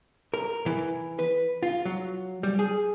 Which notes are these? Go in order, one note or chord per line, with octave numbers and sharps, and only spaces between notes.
A#4
E3
B4
F4
F#3
G3
G#4